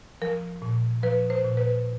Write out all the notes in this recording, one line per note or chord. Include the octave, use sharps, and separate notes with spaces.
F3 A#4
A#2
F3 B4
C5
A#2
B4